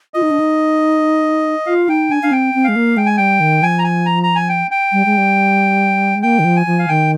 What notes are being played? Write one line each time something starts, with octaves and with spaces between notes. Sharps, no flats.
F4 D#5
D#4
D4
D#4
F4 F5
D#4 G5
D4 G#5
D4 F5
C4 G5
C4
G#3 F5
A#3
G#3 G5
G#5
G3 G5
D#3
F3 G#5
A#5
G#5
A#5
A#5
G#5
G5
G5
G3
G#3
G3
G#3
A#3 G5
D#3
F3
G#5
F3
F5
D#3 G5